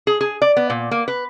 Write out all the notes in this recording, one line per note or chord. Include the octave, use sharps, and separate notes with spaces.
G#4
G#4
D5
B3
A#2
A#3
B4